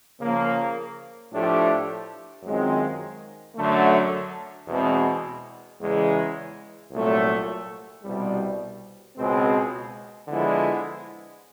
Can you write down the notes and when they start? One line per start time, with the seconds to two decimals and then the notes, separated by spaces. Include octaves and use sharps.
0.19 C#3 F3 A#3
1.31 A2 F3 A3 D4 G4
2.43 F#2 D#3 G#3 C4 F4
3.55 F#2 D3 F#3 A3
4.67 E2 B2 G#3 C4
5.80 E2 C#3 E3 G#3
6.91 C2 A#2 F#3 A3
8.03 C2 B2 G3
9.16 C#2 B2 G#3 C4
10.28 D3 F3 G#3 B3 E4